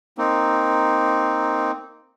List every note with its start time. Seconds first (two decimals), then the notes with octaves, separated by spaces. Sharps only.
0.18 A#3 C4 D#4